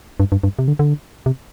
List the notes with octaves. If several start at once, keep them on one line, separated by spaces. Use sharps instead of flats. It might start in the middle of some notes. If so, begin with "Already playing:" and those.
G2
G2
G2
C3
D3
D3
C3